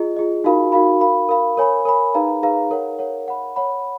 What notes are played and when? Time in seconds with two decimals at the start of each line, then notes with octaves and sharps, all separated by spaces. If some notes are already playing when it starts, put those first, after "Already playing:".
Already playing: F4 G#4 D#5
0.17 F4 G#4 D#5
0.44 D#4 F#4 A#4 F5 B5
0.72 D#4 F#4 A#4 F5 B5
1.01 A#4 F5 B5
1.29 A#4 F5 B5
1.57 A#4 C#5 G#5 B5
1.85 A#4 C#5 G#5 B5
2.14 D#4 G#4 B4 F5 A#5
2.42 D#4 G#4 B4 F5 A#5
2.71 A#4 C#5 F#5
2.99 A#4 C#5 F#5
3.27 C#5 F#5 B5
3.56 C#5 F#5 B5